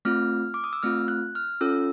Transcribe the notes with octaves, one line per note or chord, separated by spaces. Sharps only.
A3 C4 F4 F6
D6
D#6
E6
A3 C4 F4 F6
F#6
F6
C#4 F4 A4 E6